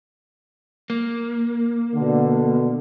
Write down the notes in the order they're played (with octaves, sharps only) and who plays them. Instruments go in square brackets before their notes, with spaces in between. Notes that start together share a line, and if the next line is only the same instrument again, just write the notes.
[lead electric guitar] A#3
[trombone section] B2 D3